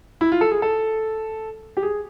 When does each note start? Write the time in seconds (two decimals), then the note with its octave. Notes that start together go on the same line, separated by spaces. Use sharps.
0.21 E4
0.32 F4
0.41 A4
0.51 G#4
0.62 A4
1.77 G4
1.83 G#4